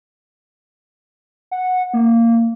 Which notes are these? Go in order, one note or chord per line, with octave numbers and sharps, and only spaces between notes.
F#5
A#3